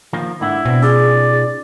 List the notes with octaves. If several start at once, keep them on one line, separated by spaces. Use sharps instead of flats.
D#3 F3 A#3
G#2 D3 E4 F#5
B2 C4 D4
C#4 D#4 F4 G#4 D5